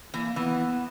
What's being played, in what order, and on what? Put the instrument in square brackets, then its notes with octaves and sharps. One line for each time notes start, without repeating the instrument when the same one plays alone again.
[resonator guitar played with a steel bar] E3 [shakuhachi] A#3
[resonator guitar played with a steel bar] E3 [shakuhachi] B3